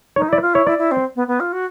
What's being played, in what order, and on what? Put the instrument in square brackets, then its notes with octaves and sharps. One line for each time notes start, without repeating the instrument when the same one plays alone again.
[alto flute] D#4 [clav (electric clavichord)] C#5
[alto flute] E4 [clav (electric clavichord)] D5
[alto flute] F4
[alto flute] E4 [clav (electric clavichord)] C#5
[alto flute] E4 [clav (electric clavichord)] D5
[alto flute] E4
C4
B3
B3
F4
F#4